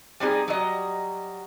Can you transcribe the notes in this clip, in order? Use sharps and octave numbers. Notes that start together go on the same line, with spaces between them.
G3 C4 D#4 G#4
F#3 G3 D#5